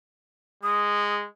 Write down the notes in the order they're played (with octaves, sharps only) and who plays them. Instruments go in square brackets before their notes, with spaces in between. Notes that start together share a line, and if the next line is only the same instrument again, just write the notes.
[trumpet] G#3 [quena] D#6